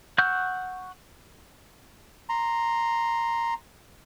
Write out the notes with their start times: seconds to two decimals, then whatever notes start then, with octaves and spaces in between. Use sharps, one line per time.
0.18 F#5 C#6 E6 F#6 G6
2.29 A#5 C6